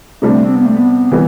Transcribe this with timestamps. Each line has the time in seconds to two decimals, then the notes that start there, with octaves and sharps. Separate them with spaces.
0.22 C3 G3 A3 D4
0.44 C4
0.55 B3
0.66 A3
0.76 B3
1.12 E3 G3